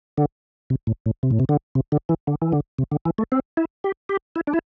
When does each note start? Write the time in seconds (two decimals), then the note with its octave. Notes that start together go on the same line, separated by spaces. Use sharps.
0.18 D3
0.70 C3
0.87 A2
1.06 A2
1.23 C3
1.31 A2
1.40 C3
1.49 D3
1.75 C3
1.92 D3
2.09 E3
2.27 D3
2.42 E3
2.52 D3
2.79 C3
2.92 D3
3.05 E3
3.18 A3
3.32 C4
3.57 E4
3.84 G4
4.09 G4
4.36 E4
4.47 D4
4.54 E4